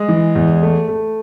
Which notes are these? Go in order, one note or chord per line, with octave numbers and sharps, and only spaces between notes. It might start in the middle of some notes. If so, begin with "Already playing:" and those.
Already playing: G#3 G#4
E3
E2
A3
A3